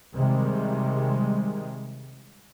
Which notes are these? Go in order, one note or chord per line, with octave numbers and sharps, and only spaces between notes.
C3 D#3 G3 G#3